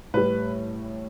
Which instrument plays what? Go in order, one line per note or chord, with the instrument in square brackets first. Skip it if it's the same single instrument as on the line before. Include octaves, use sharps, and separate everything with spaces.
[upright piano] A2 G3 B4